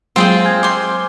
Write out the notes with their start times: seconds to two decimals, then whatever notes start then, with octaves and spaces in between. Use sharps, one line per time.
0.16 F#3 G#3 A#3 C4 F4 G#4 G5
0.45 G#5 F6 G#6
0.63 C5 C6 D6